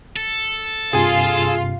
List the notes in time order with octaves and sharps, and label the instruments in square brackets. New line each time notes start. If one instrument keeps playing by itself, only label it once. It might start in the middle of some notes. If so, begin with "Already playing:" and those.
[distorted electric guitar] A4
[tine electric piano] G2 C3 [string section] F4 F5 [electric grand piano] G#4 G#5